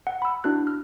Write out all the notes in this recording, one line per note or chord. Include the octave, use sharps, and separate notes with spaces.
F#5
B5 E6
D4 E4 F#4 F#6
F6